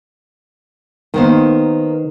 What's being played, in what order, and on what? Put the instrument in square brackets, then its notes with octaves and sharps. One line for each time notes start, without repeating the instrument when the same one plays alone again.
[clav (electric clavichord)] D#3 [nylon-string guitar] A#3 B3 C5